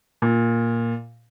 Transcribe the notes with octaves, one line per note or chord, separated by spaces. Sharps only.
A#2